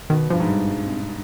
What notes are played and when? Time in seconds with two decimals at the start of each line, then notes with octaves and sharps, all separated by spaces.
0.10 B2 D#3
0.30 G2 F3
0.40 G#2
0.50 G3
0.71 G#3
0.86 C4
1.01 D4